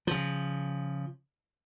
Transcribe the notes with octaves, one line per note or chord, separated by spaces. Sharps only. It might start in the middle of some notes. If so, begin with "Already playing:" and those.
C#3 F3